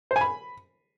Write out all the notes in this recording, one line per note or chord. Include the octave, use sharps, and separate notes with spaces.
C5
G#5
B5